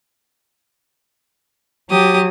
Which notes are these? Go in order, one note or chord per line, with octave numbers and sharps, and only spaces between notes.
F#3 G4 D#6